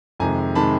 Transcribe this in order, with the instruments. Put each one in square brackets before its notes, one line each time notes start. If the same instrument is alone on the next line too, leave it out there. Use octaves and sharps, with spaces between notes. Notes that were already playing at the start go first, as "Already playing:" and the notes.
[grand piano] F2 C3 D#3 G#3 G#5 A#5
C3 D#3 G#3 A5 B5